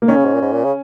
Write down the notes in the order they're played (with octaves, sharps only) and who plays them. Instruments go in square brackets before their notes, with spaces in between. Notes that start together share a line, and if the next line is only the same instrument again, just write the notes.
[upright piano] A#3
[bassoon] D#3 [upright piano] C#4
[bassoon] C#3
G#2
A#2
G#2
A#2
C#3